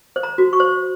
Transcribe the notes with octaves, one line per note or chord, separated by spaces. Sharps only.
C5
A#5
F#4
C#6
C5